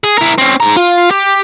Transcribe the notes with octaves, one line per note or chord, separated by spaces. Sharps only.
G#4
E4 A#4
C4 C#4
G#2 A#5
F4
G4